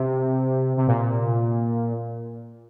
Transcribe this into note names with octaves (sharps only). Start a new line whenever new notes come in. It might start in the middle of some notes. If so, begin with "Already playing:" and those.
Already playing: C3
C3
A#2